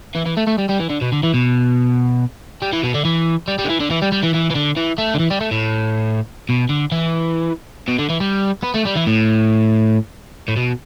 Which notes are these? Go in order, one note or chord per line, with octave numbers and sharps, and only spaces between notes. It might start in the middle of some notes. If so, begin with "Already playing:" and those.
E3
E3
A3
A3
G3
G3
E3
D3
B2
D3
E3
B2
G3
E3
B2
D3
E3
G3
G3
D3
E3
D3
E3
G3
G3
E3
E3
E3
D3
E3
A3
D3
E3
G3
A3
A2
B2
D3
E3
B2
D3
E3
G3
B3
A3
G3
E3
A2
A2
B2